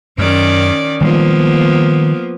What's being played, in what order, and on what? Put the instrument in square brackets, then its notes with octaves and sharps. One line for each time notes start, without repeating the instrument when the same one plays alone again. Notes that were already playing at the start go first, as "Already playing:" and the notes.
[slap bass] F#2 [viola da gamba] D#3 C#4 D5
[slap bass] D#3 G3 G#3 [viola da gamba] F3 A#3 B3